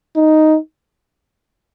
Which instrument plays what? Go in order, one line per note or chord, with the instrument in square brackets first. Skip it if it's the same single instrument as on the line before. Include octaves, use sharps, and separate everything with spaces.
[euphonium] D#4